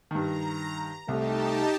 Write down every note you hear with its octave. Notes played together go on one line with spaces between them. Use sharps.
G2 D#3 A#5
C2 A3 D#4 G4 A5